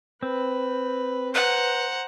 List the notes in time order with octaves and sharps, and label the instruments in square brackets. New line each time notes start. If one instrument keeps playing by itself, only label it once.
[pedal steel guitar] C4 [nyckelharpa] B4
[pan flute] B4 [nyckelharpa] C5 A#5 [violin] F#5